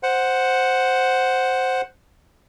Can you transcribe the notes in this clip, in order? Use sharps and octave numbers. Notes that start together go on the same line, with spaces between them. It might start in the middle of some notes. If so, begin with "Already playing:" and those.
C5 F#5